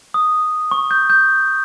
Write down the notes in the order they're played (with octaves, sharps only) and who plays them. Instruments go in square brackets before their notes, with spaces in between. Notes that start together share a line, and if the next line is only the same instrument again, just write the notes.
[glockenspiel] D#6
C#6
G6
G6